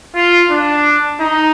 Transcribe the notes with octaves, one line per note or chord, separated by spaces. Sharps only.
F4
D4
D#4